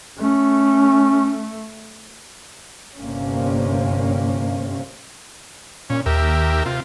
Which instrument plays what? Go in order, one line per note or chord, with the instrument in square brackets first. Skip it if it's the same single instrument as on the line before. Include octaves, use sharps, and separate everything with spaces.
[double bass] A3 [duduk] C#4
[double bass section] G1 C3 A#3 C#4
[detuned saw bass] A#2 [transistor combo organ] C#4
[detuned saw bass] D#2 [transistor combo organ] G4 A#4 E5
[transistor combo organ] C3 F4